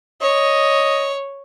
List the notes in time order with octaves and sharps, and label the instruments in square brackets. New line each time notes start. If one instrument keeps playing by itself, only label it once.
[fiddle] C#5 [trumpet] D#5